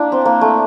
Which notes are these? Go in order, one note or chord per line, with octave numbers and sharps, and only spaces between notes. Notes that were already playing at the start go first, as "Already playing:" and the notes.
Already playing: A#3 D4 E4
C4
A#3
A3